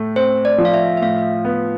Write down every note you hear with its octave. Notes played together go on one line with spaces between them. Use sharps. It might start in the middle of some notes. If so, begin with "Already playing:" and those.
Already playing: A2 A3
C4 C5
D5
F3
F5
E5
E5
A2 F5
B3